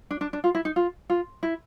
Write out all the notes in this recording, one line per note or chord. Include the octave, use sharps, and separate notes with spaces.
D4
D4
D4
F4
E4
D#4
F4
F4
E4